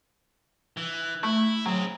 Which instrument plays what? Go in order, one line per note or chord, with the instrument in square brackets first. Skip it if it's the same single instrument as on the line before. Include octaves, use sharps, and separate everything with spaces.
[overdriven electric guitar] E3
[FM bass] A3 [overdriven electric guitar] E4
[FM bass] F#3 [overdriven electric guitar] C4 G#4